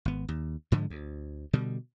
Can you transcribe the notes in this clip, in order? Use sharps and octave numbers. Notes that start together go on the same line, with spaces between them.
G#1 B3
D#2
G#2 D3 F3 G#3
D2
B2 D3 G3